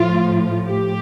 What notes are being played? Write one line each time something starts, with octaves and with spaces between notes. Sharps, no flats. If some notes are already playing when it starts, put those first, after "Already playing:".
Already playing: A2 F3 F4
G4